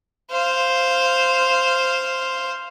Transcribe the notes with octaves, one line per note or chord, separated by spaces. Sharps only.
C5 F5